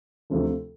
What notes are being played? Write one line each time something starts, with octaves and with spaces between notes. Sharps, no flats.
D2 C3 F3 A3